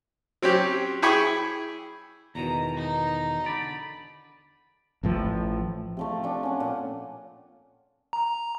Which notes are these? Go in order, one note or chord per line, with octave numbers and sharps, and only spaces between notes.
F#3 C4 C#4 G4
E4 G#4 G5 G#5 B5 C#6
E2 B2 D#3 A#5
D#4
D3 D5 B5
A1 A2 F3
C3 F3 A3
D4 G5 C#6
C#4 F#5
A#2
A#5